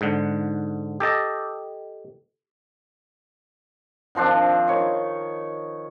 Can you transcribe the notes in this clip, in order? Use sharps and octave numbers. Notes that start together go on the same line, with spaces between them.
G#2 D3
G4 A4 D#5 A5
D#3 F3 C4 D4
D#3 C#5